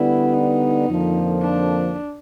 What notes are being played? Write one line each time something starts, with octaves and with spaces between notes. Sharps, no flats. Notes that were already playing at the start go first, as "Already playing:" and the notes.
Already playing: D3 G3 B3 E4
D#4
F2 D3 F3 A#3
D4